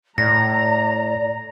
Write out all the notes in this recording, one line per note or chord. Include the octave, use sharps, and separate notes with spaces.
A2 D5 A#5 A#6